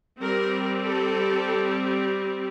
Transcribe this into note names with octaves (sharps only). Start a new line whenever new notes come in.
G3 C4 A#4
A4